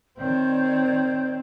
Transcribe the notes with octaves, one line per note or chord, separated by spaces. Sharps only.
D#3 C4 C#5 D5 G6